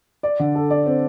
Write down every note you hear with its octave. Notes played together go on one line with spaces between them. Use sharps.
D5
D3
A4
D5
C4